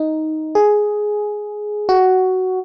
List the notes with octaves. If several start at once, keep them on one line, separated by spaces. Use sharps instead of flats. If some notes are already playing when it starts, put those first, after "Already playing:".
Already playing: D#4
G#4
F#4